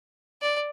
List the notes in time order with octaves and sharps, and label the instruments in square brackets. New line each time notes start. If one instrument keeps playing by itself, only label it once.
[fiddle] D5